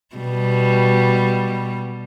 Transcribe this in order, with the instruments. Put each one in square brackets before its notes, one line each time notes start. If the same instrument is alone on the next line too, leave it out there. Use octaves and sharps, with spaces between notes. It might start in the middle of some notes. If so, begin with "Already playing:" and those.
[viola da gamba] B2 G3